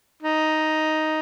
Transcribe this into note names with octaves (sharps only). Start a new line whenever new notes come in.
D#4